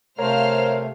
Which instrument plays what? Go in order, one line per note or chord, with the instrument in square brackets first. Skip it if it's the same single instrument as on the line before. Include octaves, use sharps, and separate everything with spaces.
[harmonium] C3 A3 [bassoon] A#4 [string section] C5 F5 F6 [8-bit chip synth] C#5